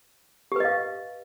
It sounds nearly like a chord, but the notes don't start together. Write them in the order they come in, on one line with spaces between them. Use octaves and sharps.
G4 B4 D#5 F5